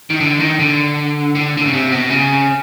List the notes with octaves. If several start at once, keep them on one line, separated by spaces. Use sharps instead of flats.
D#3
D3
D#3
D3
D3
D3
C#3
C3
B2
C#3